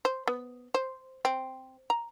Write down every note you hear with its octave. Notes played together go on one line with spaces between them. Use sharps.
C5
B3
C5
C4
A#5